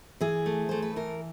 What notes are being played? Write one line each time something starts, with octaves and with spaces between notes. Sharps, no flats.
E3 G#4
A3
A3 C5
B4
E3 A#4